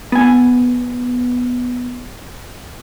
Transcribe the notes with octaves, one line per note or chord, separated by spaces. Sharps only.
B3 G#5